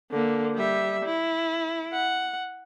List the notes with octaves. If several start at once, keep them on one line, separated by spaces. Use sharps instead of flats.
D3 A#3
G3 E5
E4
F#5